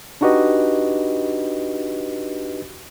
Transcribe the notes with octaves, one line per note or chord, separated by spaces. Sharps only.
D4 D#4 F#4 G4 B4 D#5